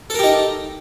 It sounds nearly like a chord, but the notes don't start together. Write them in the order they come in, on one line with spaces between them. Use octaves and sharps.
A4 A#4 G4 D#4